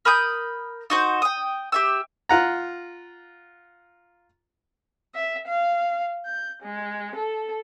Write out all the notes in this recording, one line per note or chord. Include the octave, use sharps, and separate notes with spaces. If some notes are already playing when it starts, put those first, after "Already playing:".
A#4 B5 D#6 G6
D#4 F#4 C5
G5 D#6
G4 E5 E6
F4 F#5 A#5
E5
F5
G6
G#3
A4